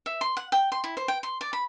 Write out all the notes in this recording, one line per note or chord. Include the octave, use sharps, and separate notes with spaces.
E5
C6
F#5
G5
C6
E4
C5
G5
C6
D5
B5